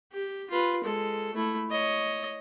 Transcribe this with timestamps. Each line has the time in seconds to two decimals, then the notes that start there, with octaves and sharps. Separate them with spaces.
0.13 G4
0.50 F4 B4
0.84 G#3 A4
1.34 A3 E4
1.71 C#5 D#5